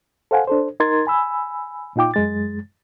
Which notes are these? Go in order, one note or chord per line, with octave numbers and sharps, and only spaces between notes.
A4 C5 F5 F#5 G#5
D4 A4 C5
D#4 A#4 C6 G#6 A6
G#5 B5 E6
A#2 D#4 F4 G5 D6
F#2 G#3 A6